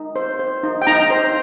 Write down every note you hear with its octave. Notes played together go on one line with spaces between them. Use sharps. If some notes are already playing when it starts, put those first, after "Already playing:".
Already playing: D#4
C5
C5
D#4
G5
D#4 A#5
C5